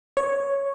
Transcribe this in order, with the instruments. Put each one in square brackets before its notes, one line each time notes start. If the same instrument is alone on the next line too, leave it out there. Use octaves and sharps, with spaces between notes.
[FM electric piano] C#5